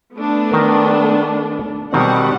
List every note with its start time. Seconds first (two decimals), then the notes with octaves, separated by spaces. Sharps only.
0.14 A3 B3 D4
0.51 D#3 A#4
1.93 B2 D#3 G3 C4 F#5